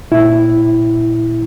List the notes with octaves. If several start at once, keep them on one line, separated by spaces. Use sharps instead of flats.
A#2 E4